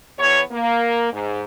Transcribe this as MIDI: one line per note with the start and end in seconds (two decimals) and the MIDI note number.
0.18 0.41 40
0.18 0.41 52
0.18 0.41 59
0.18 0.41 73
0.51 1.09 58
1.12 1.44 44